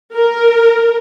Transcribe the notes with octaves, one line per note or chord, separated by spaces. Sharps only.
A#4